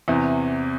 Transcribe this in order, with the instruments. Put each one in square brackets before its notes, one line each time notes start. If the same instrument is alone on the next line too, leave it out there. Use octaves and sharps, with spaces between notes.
[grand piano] E2 C3 E3